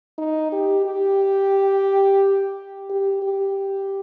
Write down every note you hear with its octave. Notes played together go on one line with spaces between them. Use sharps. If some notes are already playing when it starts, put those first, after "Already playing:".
D#4
G4
G4
G4
G4